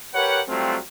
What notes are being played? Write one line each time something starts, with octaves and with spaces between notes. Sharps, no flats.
G4 A#4 B4 C#5 F#5
F#3 G3 A3 C4 F4